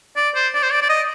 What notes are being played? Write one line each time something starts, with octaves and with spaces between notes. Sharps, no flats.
D5
C5
D5
C5
D5
D5
D#5